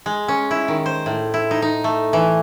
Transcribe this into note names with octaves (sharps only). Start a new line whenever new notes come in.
G#3
C#4
E4
D#3
C5
A2
E4
D#4
D#4
A3
E3